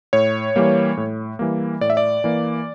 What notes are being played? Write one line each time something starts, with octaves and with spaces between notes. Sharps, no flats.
A2 C#5
E3 G3 A#3
A2
E3 G3 A#3
A2 D5
E5
D5
E3 A#3